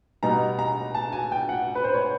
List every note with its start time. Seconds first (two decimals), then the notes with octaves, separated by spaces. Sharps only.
0.23 B2 G3 B3 D#4 A#5
0.59 A#5
0.94 A5
1.13 G#5
1.32 G5
1.49 F#5
1.75 B4
1.84 C5
1.94 C#5